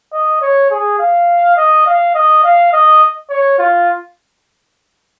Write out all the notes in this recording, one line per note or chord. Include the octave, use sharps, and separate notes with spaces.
D#5
C#5
G#4
F5
D#5
F5
D#5
F5
D#5
C#5
F4